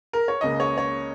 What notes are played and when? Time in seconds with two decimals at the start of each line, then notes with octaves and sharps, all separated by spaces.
0.13 A#4
0.28 C#5
0.41 C#2 C#3 A#3 D#5
0.60 C#5
0.78 C#5